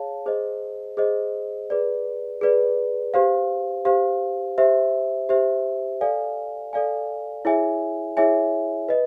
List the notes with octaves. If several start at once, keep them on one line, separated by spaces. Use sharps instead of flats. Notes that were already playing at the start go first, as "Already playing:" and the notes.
Already playing: G#4 C#5 F5 A5
G#4 C5 D#5
G#4 C5 D#5
G#4 B4 D5
G#4 B4 D5
G4 C5 F5
G4 C5 F5
G4 C5 E5
G4 C5 E5
A4 D5 F5 G#5
A4 D5 F5 G#5
E4 G#4 C#5 E5 G#5
E4 G#4 C#5 E5 G#5
B4 D#5